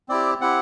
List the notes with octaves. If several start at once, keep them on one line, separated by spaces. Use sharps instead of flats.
C4 E4 G4 D5
C4 E4 G4 F#5